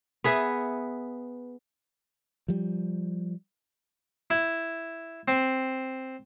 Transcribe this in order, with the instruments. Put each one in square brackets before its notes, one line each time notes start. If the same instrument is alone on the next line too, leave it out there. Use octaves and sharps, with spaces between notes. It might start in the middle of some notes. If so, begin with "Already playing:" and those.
[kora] B3 G#4 B4 E5
[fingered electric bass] F3 G3
[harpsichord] E4
C4